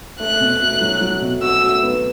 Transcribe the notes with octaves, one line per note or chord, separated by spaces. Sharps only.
A3 F#6
B2
A3
F#3
F#3
B2
F#4 E6
A3
B3